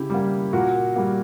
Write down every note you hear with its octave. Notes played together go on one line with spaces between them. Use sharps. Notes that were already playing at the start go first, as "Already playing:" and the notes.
Already playing: C#3 E4 G4
G3 A#3
A#2 F#4 A#4
G3 A#3